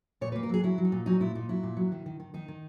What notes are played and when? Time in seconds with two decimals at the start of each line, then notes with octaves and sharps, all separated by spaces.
0.21 A#2 C#5
0.32 B4
0.36 A#3
0.43 A#4
0.49 F#3 G#4
0.63 F#3 E4
0.78 F#3
0.85 D#4
0.92 A#2
1.06 F#3 D#4
1.20 A#2 E4
1.35 A#2 D#4
1.49 F#3 E4
1.63 A#2
1.77 F#3
1.92 D#3
2.06 D#3
2.20 D#3
2.34 D#3 D#4
2.48 D#3